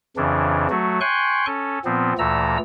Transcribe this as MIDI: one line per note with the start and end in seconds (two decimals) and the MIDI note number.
0.17 0.67 41
0.17 0.67 49
0.17 0.67 52
0.17 0.67 62
0.70 1.00 54
0.70 1.00 57
0.70 1.00 66
1.01 1.46 79
1.01 1.46 80
1.01 1.46 84
1.01 1.46 85
1.01 1.46 90
1.46 1.79 61
1.46 1.79 69
1.85 2.13 46
1.85 2.13 53
1.85 2.13 59
1.85 2.13 60
2.19 2.58 38
2.19 2.58 46
2.19 2.58 52
2.19 2.58 57
2.19 2.58 82
2.19 2.58 88